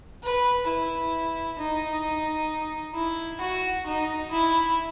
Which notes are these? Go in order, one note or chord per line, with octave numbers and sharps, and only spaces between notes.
B4
E4
D#4
E4
F#4
D#4
E4